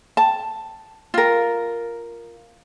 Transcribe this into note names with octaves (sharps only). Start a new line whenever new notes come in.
A5
F4 A#4